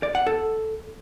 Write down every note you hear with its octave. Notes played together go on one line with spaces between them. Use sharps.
D5
F#5
A4